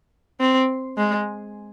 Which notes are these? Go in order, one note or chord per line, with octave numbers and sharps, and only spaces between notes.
C4
G#3